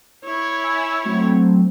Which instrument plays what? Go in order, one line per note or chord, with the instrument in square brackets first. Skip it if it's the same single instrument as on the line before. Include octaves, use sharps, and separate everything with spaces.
[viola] E4 C#5
[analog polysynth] G#5 B5 E6
F#3 A3 C4